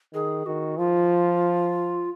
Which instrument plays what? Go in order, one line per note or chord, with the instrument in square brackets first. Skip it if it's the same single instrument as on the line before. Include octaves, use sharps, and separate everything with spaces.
[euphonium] D#3 [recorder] G#4
[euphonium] D#3 [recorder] F#4
[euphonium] F3 [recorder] F4